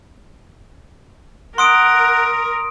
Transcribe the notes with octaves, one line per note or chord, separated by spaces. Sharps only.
A#4 F#5 C6 D#6 D7